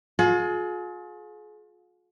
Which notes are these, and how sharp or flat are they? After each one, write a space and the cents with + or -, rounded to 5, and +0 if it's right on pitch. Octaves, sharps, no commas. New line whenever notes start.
F4 +40 G#4 +35